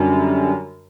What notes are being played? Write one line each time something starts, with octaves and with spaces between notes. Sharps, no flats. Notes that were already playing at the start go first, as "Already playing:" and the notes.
Already playing: F#2 D3 G3